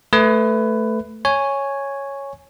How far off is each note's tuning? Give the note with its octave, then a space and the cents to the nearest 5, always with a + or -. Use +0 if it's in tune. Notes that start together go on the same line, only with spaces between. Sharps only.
A3 +0 B4 +15
C#5 +0 G#5 +0